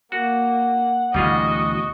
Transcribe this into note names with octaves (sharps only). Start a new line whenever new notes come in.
A#3 F#4 F#5
D2 B2 E3 G3 F4 F#4 G#4 D#5